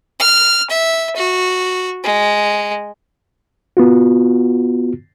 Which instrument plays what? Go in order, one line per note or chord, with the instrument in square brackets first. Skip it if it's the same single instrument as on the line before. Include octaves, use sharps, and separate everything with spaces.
[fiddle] F6
E5
F#4
G#3
[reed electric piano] B3 F4 F#4